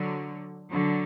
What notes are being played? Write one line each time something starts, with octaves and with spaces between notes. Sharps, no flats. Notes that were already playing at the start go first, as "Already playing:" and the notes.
Already playing: D3 F#3
D3 F#3